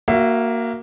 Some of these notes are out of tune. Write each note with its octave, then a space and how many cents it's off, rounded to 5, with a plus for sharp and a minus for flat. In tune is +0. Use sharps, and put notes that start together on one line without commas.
A#3 +0 F#4 +0 E5 +25